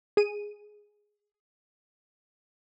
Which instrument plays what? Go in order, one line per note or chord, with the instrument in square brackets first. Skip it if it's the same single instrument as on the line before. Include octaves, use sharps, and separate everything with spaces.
[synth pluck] G#4 D#7